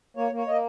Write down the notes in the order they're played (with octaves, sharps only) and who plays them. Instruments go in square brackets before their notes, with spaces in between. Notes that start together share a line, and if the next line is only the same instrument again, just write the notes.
[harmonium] A#3 C#5
A#3
C#5
A#3 D#5